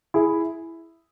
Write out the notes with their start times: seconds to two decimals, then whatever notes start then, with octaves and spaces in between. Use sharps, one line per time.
0.14 E4 G#4